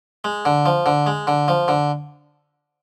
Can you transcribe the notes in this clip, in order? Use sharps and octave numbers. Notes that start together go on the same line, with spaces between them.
G#3
D3
F3
D3
G#3
D3
F3
D3